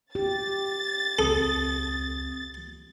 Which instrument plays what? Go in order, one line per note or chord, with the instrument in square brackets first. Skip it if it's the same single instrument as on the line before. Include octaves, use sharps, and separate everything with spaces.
[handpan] G4 [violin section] A6
[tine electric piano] C#2 C4 D#6 [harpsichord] A4